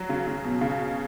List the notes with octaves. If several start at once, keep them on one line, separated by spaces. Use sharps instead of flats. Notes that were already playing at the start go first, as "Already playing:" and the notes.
Already playing: F#3
C#3
C#3
B2
C#3